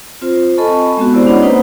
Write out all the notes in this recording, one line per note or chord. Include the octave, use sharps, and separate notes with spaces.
C4 F4 C5
A4 D#5 G#5 A5 B5 C#6
G#3 B3 C4 F#4
E4 G4 C5 D5
C#4 D4 C#5 D#5 F#5 B5
A#3 D#4 B4 C5